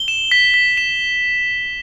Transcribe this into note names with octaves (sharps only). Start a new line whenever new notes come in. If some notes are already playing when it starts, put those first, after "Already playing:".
Already playing: G7
E7
B6
B6
E7